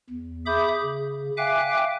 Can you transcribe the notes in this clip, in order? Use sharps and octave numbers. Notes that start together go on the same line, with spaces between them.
E2
G#4 E5 B5 D6 D#6 G6
C#3
E5 F5 G5 G#5 D6 F#6